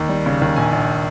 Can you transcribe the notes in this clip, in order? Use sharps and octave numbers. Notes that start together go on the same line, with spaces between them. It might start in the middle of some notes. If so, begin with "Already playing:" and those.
Already playing: D#2
G3
C#3
D#2
A#1 G#5
A#1